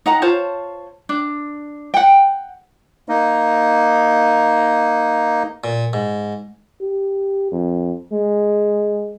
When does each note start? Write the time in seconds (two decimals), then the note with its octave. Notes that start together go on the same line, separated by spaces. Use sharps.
0.06 D#4 F#5 A#5
0.22 F4 C5 C#5 A5
1.09 D4
1.94 F#5 G5
3.09 A#3 D#4
5.64 A#2
5.93 G#2
6.81 G4
7.52 F2
8.12 G#3